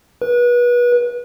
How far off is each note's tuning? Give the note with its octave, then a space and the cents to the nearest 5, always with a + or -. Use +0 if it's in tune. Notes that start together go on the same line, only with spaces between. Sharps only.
B4 -30